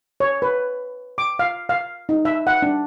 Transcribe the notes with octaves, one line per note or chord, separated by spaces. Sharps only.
C#5
B4
D6
F5
F5
D#4
E5
F#5
D4